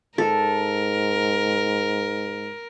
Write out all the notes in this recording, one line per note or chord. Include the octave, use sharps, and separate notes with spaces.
G#2 A4 A#4